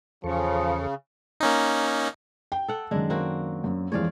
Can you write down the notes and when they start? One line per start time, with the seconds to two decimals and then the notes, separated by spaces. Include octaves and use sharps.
0.24 E2 C#3 F3 A4 C#6
1.40 A#3 C#4 D#4
2.52 G5
2.68 A4 F#5
2.91 F#2 D#3 G#3 D4
3.10 A#3 C4 F#4
3.64 F#2
3.92 F2 E3 G#3 C#5 D5 F5